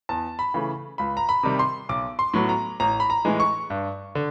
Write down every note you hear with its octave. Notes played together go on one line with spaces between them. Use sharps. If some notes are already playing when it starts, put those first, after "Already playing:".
E2 A5
B5
C#3 E3 A3
C#2 B5
A#5
B5
C3 D#3 G3
C6
B1 D6
C6
A2 F#3 B3
A#5
A1 A#5
B5
A#5
A2 E3 G#3
C#6
G2
D3